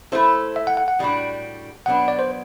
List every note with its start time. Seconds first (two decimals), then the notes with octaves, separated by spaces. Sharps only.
0.12 A3 E4 A4 C5
0.56 E5
0.67 F#5
0.77 F#5
0.88 F#5
0.99 A2 G3 B3 D4 F#4
1.86 B2 F#3 B3 D4 F#5
2.08 D5
2.19 C5